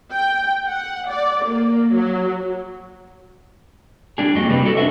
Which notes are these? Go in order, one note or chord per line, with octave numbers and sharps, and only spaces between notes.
G5
F#5
D5
A#3
F#3
G3 D4 G#4
F2 A#3 F#4 D#5
C3 F#3 G3 C4 B4
F#4 A4 D#5
C#4 D4 F#4 C5 E5